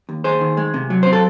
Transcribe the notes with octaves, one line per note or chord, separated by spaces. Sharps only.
D#2
D#2 G#4 C5
D#3
G#3
C3
F#3
C4 C5
A4